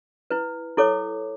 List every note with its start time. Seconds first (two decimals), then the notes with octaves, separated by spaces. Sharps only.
0.30 E4 B4
0.77 E4 A4 C#5 D6